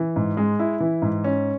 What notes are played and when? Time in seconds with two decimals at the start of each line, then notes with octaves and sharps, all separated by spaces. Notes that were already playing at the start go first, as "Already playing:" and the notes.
Already playing: E3
0.16 G#2
0.37 G#3
0.59 E4
0.80 E3
1.02 G#2
1.24 C#4